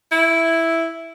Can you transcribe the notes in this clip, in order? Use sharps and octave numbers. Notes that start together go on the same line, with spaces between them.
E4